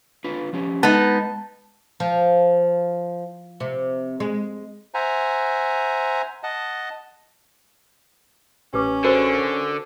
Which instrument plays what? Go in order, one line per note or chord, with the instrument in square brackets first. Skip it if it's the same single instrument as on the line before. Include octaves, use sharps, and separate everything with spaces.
[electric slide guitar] D4 F4 B4
F3 C#4 G4
[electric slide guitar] G#3 [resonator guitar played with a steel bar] B3 D#4 [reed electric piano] A5
[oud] F3
C3
G#3
[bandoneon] C5 E5 F#5 G#5 A#5
D#5 F#5 A5
[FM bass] A1 [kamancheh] C#4 [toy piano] G4 B4 D6
[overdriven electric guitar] D3 [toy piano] F#4 A#4 C5